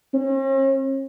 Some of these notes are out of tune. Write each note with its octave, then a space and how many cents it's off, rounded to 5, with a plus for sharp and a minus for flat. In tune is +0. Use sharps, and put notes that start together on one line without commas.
C#4 -45